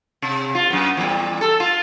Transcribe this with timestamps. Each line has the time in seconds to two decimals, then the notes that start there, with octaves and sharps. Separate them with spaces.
0.22 C3
0.55 F4
0.70 F#2 B3
0.97 E2 A#2 G3
1.41 A4
1.60 F4